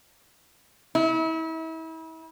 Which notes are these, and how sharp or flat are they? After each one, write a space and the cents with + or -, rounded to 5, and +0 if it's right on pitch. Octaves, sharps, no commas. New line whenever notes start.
E4 -35